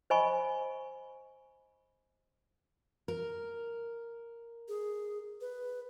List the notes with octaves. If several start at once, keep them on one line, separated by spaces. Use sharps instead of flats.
C5 D#5 G#5 B5 C#6
A#4
G#4
B4